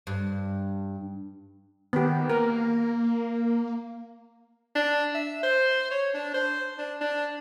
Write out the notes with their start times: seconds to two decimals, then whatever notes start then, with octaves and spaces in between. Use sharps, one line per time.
0.07 G2
1.93 D#3 B3 G4
2.30 A#3 A#4
4.76 D4
5.14 E5
5.43 C5
5.91 C#5
6.14 D4
6.34 C5
6.78 D4
7.01 D4